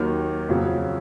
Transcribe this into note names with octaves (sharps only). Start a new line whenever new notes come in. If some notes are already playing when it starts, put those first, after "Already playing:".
Already playing: D#2 D#3 F#3 F6
F2 C#3 F#3